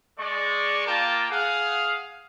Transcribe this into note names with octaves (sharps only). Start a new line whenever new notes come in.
G#3 D5 C#6
A#3 F4 A#4 G5 A5 D6
G#4 F5 F#5